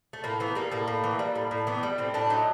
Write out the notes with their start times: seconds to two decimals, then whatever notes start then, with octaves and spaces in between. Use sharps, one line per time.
0.13 A3
0.24 A2 A#3
0.40 E3 B3
0.55 G3 A#3
0.72 A2 A#3
0.88 A2
1.04 E3
1.19 G3
1.36 A2
1.51 A2
1.67 E3 B3
1.83 G3
1.98 A2 C4
2.14 A2 D4
2.30 F#3 D#4